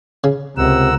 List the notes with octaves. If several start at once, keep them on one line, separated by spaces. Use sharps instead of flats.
C#3
C#2 C3 A#4 F#5 E6